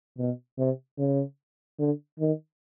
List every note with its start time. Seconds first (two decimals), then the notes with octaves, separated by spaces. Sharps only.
0.18 B2
0.58 C3
0.98 C#3
1.79 D3
2.19 D#3